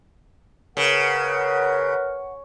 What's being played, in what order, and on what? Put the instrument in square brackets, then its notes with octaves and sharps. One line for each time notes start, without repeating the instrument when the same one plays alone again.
[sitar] C#3 [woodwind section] A#4 B4 F#5